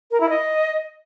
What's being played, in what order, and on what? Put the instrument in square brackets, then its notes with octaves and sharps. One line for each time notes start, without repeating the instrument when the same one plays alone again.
[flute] A#4
E4
D#5